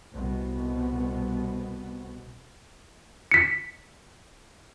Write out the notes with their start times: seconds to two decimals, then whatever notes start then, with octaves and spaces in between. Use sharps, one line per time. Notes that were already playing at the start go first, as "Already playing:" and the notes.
0.12 C2 B2 B3
3.32 B6 C#7